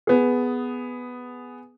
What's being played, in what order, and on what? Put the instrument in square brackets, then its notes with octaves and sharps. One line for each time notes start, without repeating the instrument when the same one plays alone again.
[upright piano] B3 G#4